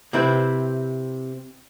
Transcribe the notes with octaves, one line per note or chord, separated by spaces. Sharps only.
C3 C4 E4 B4